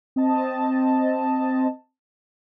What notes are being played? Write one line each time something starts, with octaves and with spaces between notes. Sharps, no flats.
C4 D#5 A5